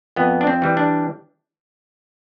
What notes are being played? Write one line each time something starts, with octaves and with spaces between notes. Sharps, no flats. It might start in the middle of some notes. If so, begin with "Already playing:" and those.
F2 B3
D4
C4
E3 G3
D4